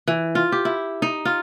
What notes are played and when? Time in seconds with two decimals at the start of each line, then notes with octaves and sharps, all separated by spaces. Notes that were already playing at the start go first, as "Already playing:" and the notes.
0.08 E3
0.35 F4
0.52 G4
0.65 E4
1.02 D#4
1.25 F4